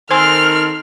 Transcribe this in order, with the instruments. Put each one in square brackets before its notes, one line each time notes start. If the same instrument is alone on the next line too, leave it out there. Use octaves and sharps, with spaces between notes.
[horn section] D#3 A4 [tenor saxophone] C4 [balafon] C5 G#5 C6 [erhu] F6